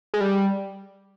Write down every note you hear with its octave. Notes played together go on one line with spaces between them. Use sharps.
G#3
G3